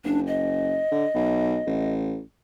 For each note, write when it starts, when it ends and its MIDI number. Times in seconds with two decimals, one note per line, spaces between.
0.05 0.81 30
0.05 0.20 62
0.27 1.92 75
0.91 1.05 50
1.15 1.60 35
1.66 2.21 33